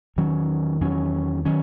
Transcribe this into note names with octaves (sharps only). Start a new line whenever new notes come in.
E2 D#3 F#3 C#4
E2 D#3 F#3 C#4
D#3 F#3 C#4